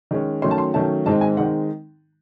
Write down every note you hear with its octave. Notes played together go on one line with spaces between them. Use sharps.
D#3 G#3 C#4
D#3 F#3 A3 C#4 C6
A5
C6
D#3 F#3 A3 C#4 A5
G#2 D#3 G#3 C4 D#4 A5
G#5
D#3 G#3 C4 D#4 F#5